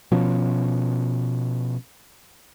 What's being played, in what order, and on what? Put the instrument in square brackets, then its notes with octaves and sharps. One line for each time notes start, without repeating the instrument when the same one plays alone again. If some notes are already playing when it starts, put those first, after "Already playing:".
[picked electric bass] B2 F3 C#4